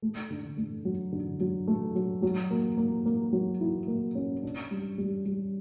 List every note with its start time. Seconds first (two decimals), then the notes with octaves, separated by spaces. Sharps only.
0.02 A3
0.30 D3
0.57 A3
0.85 F#3
1.12 D3
1.40 F#3
1.67 A3
1.95 F#3
2.22 F#3
2.51 A#3
2.77 A#3
3.06 A#3
3.33 F#3
3.61 E4
3.88 A#3
4.15 C#4
4.43 D4
4.71 G3
4.98 G3
5.26 G3